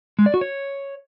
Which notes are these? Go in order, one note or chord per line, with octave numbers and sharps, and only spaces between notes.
G#3
D5
F#4
C#5